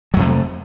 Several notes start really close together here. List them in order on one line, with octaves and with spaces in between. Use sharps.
F#3 F2 C3 A3